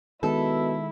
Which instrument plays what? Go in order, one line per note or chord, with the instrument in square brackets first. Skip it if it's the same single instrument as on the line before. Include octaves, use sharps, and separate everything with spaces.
[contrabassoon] B2 [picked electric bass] D#3 G#3 [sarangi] E4 [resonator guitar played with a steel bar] A4